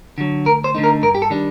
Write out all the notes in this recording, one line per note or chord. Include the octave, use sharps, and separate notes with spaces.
D3 F#3
D2 A#4
C5
D3 A3 D#4
A#4
G2 A#4
G4
A4
D#3 G3 D4